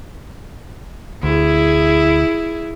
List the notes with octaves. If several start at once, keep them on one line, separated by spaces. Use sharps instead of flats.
D2 E4 G#4